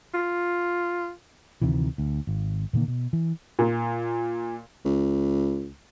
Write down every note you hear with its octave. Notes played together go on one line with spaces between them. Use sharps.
F4
D2 C3 D#3 E3
D2
G#1
A#2 D3 D#3 A#3
B2
E3
A#2
C#2